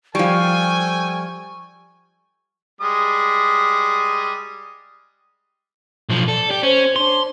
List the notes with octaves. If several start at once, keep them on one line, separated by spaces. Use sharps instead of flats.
F3 G3 A4 G5 G#5 C#6
G3 G#3 D#6
B1 F3
A4 D5
G4 D5
C#4 C5
D4 C6